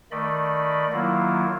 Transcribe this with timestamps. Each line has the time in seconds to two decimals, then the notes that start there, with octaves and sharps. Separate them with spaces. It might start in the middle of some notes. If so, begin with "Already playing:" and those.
0.12 D#3 A3 D5 D#5 B5
0.92 D#3 F#3 A#3 E4 F4